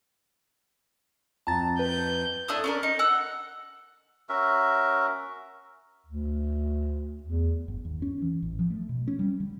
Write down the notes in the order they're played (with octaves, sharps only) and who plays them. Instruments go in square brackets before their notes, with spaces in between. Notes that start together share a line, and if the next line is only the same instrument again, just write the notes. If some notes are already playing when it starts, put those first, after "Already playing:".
[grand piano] F2 [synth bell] A5 A#5 A6
[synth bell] B4 [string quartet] G6
[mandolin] A3 D4 E4 D#6
C#4 D4 A#4
D#4
F#5 E6 F#6
[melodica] C#4 F#4 A#4 E5
[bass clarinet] D2
E2
[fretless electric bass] G1
D#2
C#4
E3
A1
F3
A3
B2
C#4
G3
D3